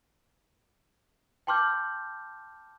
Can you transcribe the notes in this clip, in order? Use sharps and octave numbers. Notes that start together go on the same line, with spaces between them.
G5 A5 C6 D6 F6 G6